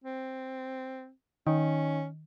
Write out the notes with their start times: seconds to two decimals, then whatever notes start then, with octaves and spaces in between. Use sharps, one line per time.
0.04 C4
1.47 D#3 C#4